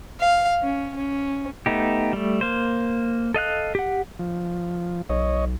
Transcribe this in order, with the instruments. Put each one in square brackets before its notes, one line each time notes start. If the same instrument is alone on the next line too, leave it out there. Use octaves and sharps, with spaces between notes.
[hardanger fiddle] F5
C#4
C#4
[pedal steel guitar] A3 B3 D#4 G4
G3 A3
A#3 C5
A4 D#5 F5 F#6
G4 F#5
[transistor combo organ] F3
[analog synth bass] B1 [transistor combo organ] C#5 D#5